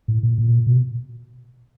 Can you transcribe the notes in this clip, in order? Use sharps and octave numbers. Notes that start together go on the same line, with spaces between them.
A2
A#2
A#2
B2